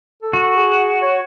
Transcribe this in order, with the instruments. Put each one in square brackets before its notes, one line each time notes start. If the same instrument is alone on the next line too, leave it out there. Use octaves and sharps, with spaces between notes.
[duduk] A4
[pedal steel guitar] F#4
[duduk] G#4
C#5